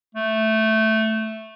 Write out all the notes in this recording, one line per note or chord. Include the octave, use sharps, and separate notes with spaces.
A3